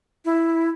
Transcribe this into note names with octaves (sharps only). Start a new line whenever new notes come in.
E4